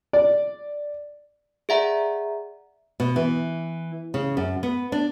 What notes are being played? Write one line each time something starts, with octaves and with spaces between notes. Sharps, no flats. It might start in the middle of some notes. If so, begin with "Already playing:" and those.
D5
G#4 D5 E5 F#5 A#5
B2
E3
C#3
F#2
B3
D4